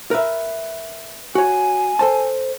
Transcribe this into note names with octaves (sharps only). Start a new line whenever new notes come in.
A#4 B4 E5
F#4 C#5 G#5
A4 C5 A5